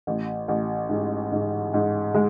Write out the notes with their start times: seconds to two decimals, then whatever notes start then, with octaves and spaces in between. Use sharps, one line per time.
0.07 A1
0.48 A1
0.89 G#2
1.32 G#2
1.74 G#2
2.14 G#3